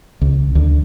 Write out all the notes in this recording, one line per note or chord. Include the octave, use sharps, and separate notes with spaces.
C#2
D2